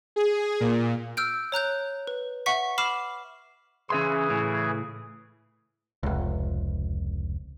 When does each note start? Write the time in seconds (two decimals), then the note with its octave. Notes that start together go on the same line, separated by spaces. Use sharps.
0.16 G#4
0.60 A#2
1.17 E6 F6 G6 D7
1.52 C#5 A#5 F#6 G6
2.07 B4
2.46 E5 F#5 C#6 B6
2.78 B5 D6 F6 C7 E7
3.90 C#3 E3 C#4 G#4 E5 C6
4.30 A2
6.03 F1 C#2